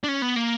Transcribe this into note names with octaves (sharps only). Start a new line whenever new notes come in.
D4
C#4
B3
A#3